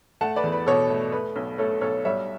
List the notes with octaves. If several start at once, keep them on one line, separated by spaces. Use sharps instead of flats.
A3 F#5 A5
B4 D5
E2
B4
B2 A4 C#5
A3
A3 B4
B1
A3 A4 C#5
B1 A4 C#5
G3 C#5 E5